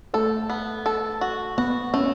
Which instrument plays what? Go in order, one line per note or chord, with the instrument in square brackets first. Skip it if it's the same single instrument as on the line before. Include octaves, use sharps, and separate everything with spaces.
[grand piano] A3 [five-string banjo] A4
[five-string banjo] B3
A4
F#4
[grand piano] B3 [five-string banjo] F#4
[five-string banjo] A3 [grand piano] C#4